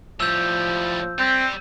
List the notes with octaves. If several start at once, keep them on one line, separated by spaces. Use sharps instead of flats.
A2 F3 G3 E6 G6
G3 C4